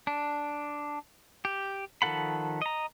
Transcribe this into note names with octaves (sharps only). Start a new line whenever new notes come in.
D4
G4
D#3 F3 A4 F#5 B5
D#5 A#5